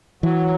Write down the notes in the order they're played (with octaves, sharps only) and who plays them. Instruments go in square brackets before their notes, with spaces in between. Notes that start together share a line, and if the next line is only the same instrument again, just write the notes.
[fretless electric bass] E3 [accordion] F#3